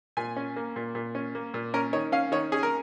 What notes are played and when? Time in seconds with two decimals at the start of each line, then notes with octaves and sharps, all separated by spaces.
0.17 A#2 G#5
0.36 C#4
0.56 A#3
0.76 A#2
0.95 A#2
1.15 C#4
1.35 A#3
1.54 A#2
1.74 C#4 A#4
1.93 D#3 C#5
2.12 C#4 F5
2.32 D#3 C#5
2.52 C#4 G#4
2.63 A#4